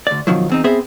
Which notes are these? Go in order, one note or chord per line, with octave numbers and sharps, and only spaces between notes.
D2 D5
B2 D#3 F3 F#3
E2 C4 D#4
B3 C4 G#4 C5 E5